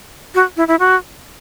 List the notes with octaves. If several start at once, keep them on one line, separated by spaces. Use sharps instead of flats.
F#4
E4
E4
F#4